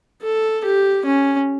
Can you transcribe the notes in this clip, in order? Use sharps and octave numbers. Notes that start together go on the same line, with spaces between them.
A4
G4
C#4